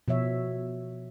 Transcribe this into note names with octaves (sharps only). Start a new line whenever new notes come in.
B2 F3 C#5 E5